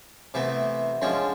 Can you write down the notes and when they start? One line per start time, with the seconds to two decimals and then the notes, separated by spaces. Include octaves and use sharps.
0.34 C3 E3 A3 B3
1.02 D3 F3 G#3 C#4